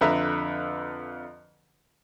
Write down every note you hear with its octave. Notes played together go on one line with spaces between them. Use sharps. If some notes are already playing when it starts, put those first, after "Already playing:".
F2 D3 B4 E5 A#5 E6